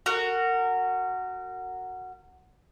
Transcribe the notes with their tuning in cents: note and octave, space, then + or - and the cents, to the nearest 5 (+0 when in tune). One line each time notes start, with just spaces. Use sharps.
F#4 +0 A#4 -30